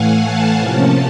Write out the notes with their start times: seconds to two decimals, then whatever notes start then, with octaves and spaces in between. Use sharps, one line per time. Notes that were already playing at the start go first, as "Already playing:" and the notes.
Already playing: A2 E3 A3 F5 F#5 G#5
0.24 A5
0.58 C3 F3 A#3 C#4 A5